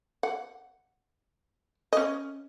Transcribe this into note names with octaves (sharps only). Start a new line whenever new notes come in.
F#5
C#4 D#5